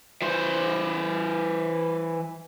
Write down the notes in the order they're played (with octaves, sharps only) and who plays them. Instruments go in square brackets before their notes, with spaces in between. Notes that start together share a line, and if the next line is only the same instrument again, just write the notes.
[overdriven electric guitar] E3 C5